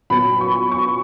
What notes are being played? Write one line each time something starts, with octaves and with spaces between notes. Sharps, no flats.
A#2 F#3 B3 B5
C#6
C#6